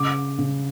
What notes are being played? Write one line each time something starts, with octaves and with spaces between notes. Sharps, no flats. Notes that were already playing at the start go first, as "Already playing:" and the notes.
Already playing: C#3 D6
C#3